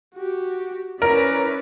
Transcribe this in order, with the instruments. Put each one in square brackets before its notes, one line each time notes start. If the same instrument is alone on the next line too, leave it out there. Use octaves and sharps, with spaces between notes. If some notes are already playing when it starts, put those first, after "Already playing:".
[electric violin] F#4 G4
[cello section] C#4 E4 [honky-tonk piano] A#4 [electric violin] B4 D5